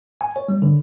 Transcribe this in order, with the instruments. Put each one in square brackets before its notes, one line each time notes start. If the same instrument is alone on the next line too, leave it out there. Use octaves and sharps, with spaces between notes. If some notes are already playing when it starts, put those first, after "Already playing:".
[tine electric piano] G#5
C#5
G3
D3